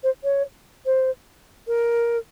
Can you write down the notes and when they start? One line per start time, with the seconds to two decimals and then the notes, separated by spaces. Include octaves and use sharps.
0.03 C5
0.24 C#5
0.86 C5
1.68 A#4